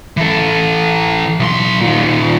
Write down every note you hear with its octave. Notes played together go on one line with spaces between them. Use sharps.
E3 A4
B1 C6
A#2 D#3